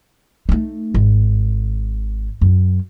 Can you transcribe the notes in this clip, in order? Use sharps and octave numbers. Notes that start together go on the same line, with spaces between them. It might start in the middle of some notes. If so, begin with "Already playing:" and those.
A3 D#4
G#1
F#2